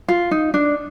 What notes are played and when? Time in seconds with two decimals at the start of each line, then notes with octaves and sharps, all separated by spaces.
0.08 F4
0.31 D#4
0.54 D4